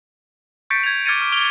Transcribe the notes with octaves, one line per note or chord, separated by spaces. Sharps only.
C#6 G6 A6 B6 C#7 D7
G#6 F7
D6 F6 G#6 A6 C#7 D#7
D6 F6 D7
D6 F6 D7 F7 G7